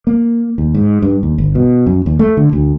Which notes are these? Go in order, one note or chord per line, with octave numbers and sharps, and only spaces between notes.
A#3
D#2
G#2
G2
D#2
G1
B2
F#2
D#2
A3
D3
D2